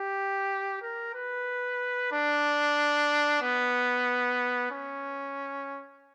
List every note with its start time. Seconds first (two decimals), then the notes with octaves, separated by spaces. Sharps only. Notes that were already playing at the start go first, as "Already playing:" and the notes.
Already playing: G4
0.82 A#4
1.14 B4
2.12 D4
3.42 B3
4.71 C#4